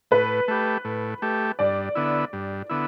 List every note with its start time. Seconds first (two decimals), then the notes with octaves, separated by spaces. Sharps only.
0.11 A2 B4
0.48 A3 G4
0.85 A2
1.22 A3 G4
1.59 G2 D5
1.95 D3 B3 E4
2.33 G2
2.70 D3 B3 E4